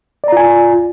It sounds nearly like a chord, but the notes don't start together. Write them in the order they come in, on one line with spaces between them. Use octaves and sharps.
D5 A#5 F4 G#5